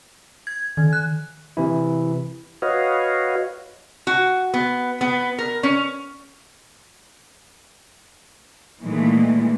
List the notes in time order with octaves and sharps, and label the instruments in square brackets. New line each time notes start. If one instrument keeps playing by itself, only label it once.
[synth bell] G#6
D#3
F#6
[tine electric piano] C3 E3 E4
[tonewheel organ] F#4 B4 C#5 D#5 F5
[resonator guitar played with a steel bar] F#4
B3
B3
A#4
C#4
[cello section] A#2 D#3 E3 G#3 A3 B3